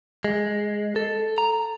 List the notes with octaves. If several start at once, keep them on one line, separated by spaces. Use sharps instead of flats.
G#3
A4
A#5